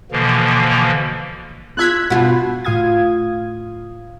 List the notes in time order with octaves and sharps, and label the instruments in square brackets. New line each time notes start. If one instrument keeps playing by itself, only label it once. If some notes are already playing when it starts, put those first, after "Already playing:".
[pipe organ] B2 D3 E3 F3 A#3
[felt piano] F4 E6 [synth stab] F#6 G#6 B6
[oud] B2 F4 [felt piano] F#4
[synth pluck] A2 F4 F5 D#6 G#6